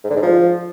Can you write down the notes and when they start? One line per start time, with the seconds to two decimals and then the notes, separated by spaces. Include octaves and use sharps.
0.04 G#2
0.10 D3
0.16 G#2
0.22 F3